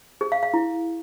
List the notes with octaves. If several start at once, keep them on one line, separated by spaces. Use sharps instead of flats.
G#4
F5
F5
E4